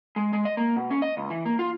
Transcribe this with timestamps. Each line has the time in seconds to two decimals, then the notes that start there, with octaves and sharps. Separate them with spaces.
0.16 G#3
0.33 G#3
0.45 D#5
0.57 A#3
0.76 B2
0.90 C#4
1.02 D#5
1.17 C#2
1.30 E3
1.45 A#3
1.59 F4